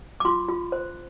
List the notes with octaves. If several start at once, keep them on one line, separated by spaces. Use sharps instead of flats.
D6
F4 C6
F4
C5